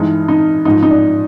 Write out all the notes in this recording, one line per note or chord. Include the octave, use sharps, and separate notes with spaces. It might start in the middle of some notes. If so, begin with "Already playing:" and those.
Already playing: G2 E3 G#3 D#4
D#4
G#2 F3 G#3 D#4
D#4
D4